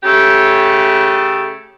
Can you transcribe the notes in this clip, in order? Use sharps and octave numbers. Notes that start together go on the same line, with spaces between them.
C#3 A3 G4